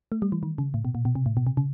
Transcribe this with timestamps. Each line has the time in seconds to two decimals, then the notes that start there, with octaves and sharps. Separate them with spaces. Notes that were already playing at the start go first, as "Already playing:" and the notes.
0.12 A3
0.22 G3
0.32 E3
0.43 D#3
0.58 C#3
0.74 A2
0.85 B2
0.95 A#2
1.05 B2
1.15 C3
1.26 A2
1.37 B2
1.47 C3
1.57 C#3